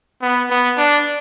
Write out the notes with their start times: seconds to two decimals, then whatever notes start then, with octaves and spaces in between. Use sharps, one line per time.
0.22 B3
0.50 B3
0.78 D4